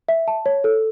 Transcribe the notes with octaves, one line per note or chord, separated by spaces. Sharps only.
E5
A5
C#5
A4